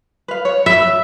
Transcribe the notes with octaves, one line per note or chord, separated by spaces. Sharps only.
B4 F5
C#5
B4 E5